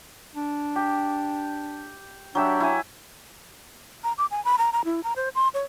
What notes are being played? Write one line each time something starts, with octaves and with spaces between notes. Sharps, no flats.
D4
G4
F#3 D4 G4 E5
E4 G#5
A#5
D6
G#5
B5
A#5
A#5
E4
A#5
C5
C6
C#5